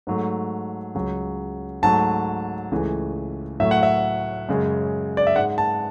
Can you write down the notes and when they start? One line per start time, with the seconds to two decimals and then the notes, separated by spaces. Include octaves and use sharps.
0.07 G#2 F#3 A3
0.95 C#2 C#3 F#3
1.83 G#2 F#3 A3 A5
2.71 C#2 C#3 E3 A3
3.60 A2 F#3 A3 E5
3.71 F#5
3.83 E5
4.49 F#2 C#3 G#3
5.17 D5
5.27 E5
5.36 G#2 G#3 F#5
5.58 A5